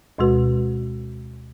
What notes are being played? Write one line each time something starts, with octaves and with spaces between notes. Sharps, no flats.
D2 B2 G#3 F#4 B4